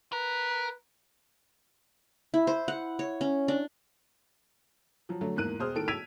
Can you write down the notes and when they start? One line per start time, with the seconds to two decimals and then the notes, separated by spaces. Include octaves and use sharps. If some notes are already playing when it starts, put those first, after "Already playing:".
0.13 A#4 B4
2.34 E4
2.47 C5
2.68 F#5
2.99 C#5
3.21 C#4
3.48 D4
5.09 F3 F#3
5.21 D3 F#3 A3
5.36 E2 G#2 A#3 F#6 D#7
5.59 E1 G#4 C5 D#6 F6
5.74 A2 D#3 A4 D7
5.88 E6 G#6 B6 D7 D#7 F7